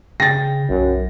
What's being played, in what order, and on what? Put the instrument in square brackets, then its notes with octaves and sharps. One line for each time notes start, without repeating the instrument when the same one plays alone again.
[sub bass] C#3 [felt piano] G5 A6 [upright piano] A#6
[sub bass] B1 [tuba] F#2